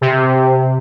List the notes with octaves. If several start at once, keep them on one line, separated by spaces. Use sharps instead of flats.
C3